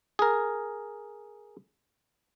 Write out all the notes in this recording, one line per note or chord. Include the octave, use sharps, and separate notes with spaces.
G#4 A#4